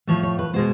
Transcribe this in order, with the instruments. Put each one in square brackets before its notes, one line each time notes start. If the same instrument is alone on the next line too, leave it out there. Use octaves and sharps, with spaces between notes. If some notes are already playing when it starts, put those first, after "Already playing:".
[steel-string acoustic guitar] A2 F3 A3 C#5
C#5
B4
B2 G#3 B3 C5